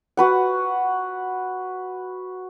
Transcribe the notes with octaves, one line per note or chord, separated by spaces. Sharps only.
F#4 B4 F#5